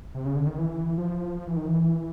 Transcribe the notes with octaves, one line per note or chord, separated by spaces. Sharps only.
C3
C#3
D3
D#3
E3
F3
F3
E3
D#3
E3